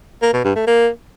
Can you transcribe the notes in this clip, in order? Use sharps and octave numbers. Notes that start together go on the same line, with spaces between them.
A#3
B2
G2
A3
A#3